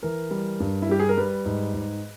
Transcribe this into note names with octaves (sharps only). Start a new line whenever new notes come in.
E3 A#4
G3
G2
E4
G3 G4
G#4
A#4
G3 B4
G#2
G#2